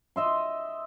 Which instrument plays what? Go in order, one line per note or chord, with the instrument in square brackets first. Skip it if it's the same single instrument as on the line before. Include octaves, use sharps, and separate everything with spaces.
[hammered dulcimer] D#5 E5 C6